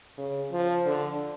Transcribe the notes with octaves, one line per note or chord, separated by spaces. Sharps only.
C#3
F3
D3